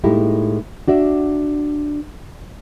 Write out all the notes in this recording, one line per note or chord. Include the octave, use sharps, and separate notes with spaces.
A2 G#3 A#3 D#4 E4 G4
D4 F#4 D5 E5